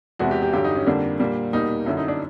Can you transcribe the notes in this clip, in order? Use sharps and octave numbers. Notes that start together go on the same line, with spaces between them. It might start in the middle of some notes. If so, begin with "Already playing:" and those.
E2 C3 E3 G#3 F#4
G4
G4
G2 D3 F#3 G4
D#4
C#4
F2 D3 G3 A#3 D4
A#2 G3 A#3
E2 B2 G3 A#3 D#4
F#2 D3 F#3 E4
D#4
D4